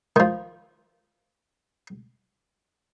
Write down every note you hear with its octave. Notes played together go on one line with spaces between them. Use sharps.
D#3 F3